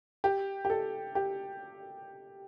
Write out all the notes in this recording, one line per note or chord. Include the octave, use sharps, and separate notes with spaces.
G4
G4
A4
G4